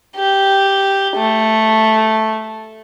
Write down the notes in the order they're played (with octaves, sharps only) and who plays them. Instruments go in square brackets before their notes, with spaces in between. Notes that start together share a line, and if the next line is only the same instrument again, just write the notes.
[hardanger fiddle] G4
A3